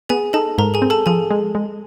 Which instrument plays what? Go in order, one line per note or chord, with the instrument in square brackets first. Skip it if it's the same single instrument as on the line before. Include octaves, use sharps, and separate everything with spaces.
[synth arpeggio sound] B3 [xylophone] G#4 G#5
[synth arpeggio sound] D#4 [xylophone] A4 A5
[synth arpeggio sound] G#2 [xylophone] A#4 A#5
[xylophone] G#4 G#5
[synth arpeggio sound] C4
[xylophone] A4 A5
[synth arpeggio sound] F3 [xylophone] G#4 G#5
[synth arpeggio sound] G#3
G#3